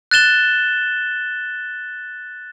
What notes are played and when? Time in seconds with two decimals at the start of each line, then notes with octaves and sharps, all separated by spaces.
0.11 F#6 A6 E7 G7